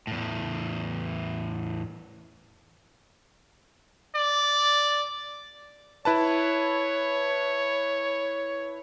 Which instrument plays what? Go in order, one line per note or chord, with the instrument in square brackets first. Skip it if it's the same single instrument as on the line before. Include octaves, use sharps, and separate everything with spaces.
[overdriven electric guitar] E2 A2
[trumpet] D5
[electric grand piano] E4 B4 A5 [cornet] C#5